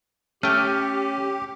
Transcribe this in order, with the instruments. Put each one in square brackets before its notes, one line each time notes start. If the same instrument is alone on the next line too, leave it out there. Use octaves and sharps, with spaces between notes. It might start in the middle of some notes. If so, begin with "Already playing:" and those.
[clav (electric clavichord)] A3 G5 [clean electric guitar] C#4 [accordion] G4 [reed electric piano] F6